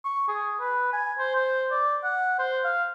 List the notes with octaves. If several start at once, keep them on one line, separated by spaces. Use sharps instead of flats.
C#6
G#4
B4
G#5
C5
C5
D5
F#5
C5
F5